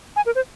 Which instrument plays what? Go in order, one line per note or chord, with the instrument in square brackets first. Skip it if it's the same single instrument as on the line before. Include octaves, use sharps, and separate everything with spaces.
[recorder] G#5
A#4
C5